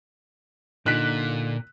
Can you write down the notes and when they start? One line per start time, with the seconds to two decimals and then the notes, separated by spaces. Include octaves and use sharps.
0.86 A#2 D3 D#4 F#6 B6